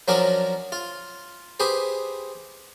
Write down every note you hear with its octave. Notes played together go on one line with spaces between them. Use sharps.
F3 F#3 C#4 D4 F#4 A#4
F4
G4 G#4 B4 C5